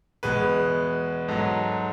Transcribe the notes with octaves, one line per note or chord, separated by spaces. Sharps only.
E2 B2 G#3 B4
G#2 F#3 A4